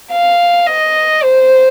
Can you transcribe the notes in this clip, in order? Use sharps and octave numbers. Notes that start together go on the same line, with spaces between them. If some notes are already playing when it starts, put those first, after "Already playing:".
F5
D#5
C5